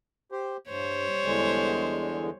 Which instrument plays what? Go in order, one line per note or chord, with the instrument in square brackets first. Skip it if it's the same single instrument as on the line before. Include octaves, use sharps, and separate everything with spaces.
[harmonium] G4 C5
[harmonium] G2 [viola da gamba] G3 C5 C#5
[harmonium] E2 D3 G#3